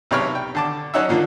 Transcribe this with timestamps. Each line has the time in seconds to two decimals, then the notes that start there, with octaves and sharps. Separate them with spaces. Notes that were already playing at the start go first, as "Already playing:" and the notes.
0.11 B1 C3 G4 C#5 B5 F6
0.35 G5
0.55 D3 A5 D6
0.94 F#3 C#4 D#4 F#4 E5
1.09 A#2 D3 F3 A#3